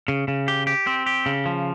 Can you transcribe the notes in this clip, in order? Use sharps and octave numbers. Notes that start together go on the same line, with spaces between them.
C#3
C#3
G4
G4
C4
G4
C#3
F3